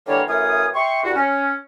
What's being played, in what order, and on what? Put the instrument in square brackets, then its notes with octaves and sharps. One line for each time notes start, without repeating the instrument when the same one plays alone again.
[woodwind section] D3 E3 G3 A#3 C#5
F#2 E3 A3 F5 G#5 D#6
E5 G5 C6 C#6
C2 F#4
C#4